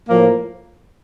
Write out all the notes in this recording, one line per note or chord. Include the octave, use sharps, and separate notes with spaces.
A2 F3 A#3